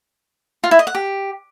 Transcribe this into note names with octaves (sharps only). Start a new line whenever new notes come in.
F4
E4
D#5
F#5
G4